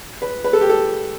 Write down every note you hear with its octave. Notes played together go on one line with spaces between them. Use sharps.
B4
B4
A4
G4
A4